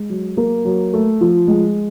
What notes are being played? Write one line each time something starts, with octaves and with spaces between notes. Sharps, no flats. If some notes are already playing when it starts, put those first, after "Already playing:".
Already playing: G#3
F#3
A#3
F#3
A3
F3
G#3